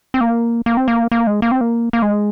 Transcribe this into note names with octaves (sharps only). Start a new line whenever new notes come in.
C4
A#3
A#3
C4
A#3
A#3
G#3
A#3
C4
A#3
A#3
G#3